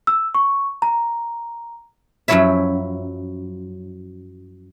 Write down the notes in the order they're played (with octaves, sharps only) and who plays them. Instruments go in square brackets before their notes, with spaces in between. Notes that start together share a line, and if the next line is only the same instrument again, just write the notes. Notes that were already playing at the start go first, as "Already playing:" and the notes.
[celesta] E6
C#6
A#5
[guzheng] F#2 F3 F#3 E4 C#5 E5